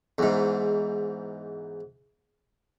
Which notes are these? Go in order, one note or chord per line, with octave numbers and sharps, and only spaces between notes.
E2 G#2